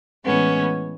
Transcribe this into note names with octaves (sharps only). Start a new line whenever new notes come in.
A2 E3 G#3 B3 C#4